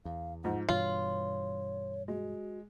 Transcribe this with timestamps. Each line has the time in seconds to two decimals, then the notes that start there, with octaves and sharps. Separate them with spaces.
0.05 E2 F5
0.44 G#2 F3 F#5
0.69 G2 B2 E3 F4 C#5 F#7
2.08 G#3 F#4